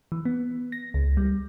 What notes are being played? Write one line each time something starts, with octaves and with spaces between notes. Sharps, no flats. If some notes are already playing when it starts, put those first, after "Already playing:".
E3
B3
A#6
C#2
G3